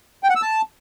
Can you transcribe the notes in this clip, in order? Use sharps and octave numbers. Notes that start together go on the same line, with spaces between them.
G5
F#5
E6
A5